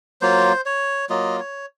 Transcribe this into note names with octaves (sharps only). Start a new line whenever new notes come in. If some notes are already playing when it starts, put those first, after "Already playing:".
F#3 A#3 F4 C5
C#5
F#3 A#3 F4 D#5
C#5